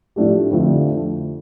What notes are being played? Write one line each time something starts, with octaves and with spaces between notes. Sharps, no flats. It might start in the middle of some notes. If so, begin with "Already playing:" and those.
A2 F3 A3 D4 G4
F2 D3 F3 A3